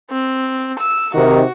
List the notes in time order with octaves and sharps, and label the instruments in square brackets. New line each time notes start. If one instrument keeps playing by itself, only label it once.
[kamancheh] C4
E6
[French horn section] C3 D#3 [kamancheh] F#4